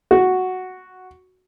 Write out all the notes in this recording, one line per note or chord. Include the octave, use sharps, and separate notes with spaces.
F#4